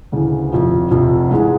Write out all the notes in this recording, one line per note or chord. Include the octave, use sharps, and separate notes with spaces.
D2 C#3 E3
F1 F2 C3 F3
F1 F2 C3 F3
G#2 E3 G#3